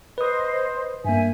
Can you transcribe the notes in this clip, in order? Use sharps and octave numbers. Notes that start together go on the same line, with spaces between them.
B4 C5 D#5 D#6
G2 A#3 E5 G#5